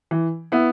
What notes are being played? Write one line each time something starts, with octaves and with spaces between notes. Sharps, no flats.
E3
B3 E4